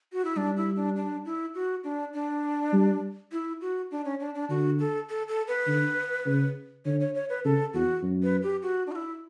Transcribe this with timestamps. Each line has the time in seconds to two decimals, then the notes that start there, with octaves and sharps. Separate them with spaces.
0.13 F#4
0.25 E4
0.37 G3 D4
0.57 E4
0.76 D4
0.96 D4
1.25 E4
1.55 F#4
1.84 D4
2.13 D4
2.73 G3
3.32 E4
3.61 F#4
3.91 D4
4.05 C#4
4.20 D4
4.35 D4
4.50 D3 F#4
4.79 A4
5.09 A4
5.28 A4
5.48 B4
5.67 D3
6.26 C#3
6.85 D3 C#5
7.00 C#5
7.15 C#5
7.29 B4
7.45 C#3 A4
7.74 E2 F#4
8.03 F#2
8.23 B4
8.43 G4
8.62 F#4
8.87 D4
8.92 F#4
8.96 E4